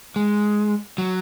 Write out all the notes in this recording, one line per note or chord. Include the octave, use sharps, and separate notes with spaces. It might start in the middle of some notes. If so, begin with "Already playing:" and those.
G#3
F#3